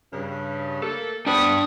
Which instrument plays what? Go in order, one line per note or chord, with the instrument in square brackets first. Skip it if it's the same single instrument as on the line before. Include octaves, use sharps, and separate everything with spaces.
[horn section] G2 C#3
A3 A#3 A4
[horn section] B3 C4 B5 [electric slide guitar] D4 D5 G5 [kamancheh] D#6